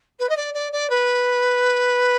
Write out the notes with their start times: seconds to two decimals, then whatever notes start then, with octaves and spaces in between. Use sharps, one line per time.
0.19 B4
0.29 D#5
0.36 D5
0.54 D5
0.72 D5
0.89 B4